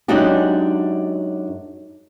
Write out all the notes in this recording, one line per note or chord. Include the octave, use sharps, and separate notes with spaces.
F#2 G#3 D4 D#4 F#4 G4